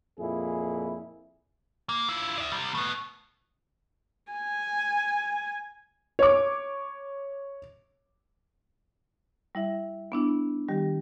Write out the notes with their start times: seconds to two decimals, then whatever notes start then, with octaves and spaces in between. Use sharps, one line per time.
0.19 F2 A#2 E4 G#4
1.89 A#3
2.09 E4 F4
2.38 D5 E5
2.52 C3 G3
2.75 A3 B3
4.32 G#5
6.19 C#5 D6
9.55 G3 E4 E5
10.12 B3 D4 E4
10.69 D#3 G3 G4